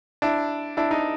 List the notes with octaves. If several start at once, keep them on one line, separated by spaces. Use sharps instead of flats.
D4 E4
D4 E4
D#4